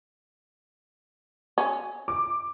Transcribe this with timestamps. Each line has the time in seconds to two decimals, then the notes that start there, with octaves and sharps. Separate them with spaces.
1.58 C#4
2.08 D6